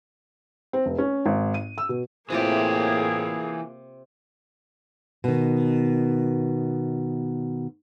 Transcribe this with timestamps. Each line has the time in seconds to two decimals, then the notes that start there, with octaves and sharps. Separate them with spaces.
0.73 C4
0.86 F1
0.98 C#4
1.26 G#1
1.54 D#7
1.78 E6
1.89 B2
2.30 A2 C3 E3 A#3 F4 G4 G#4 E5
5.24 B2 D#3